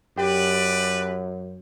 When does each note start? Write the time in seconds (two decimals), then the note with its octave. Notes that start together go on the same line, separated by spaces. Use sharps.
0.17 F#2 G4 B4 D5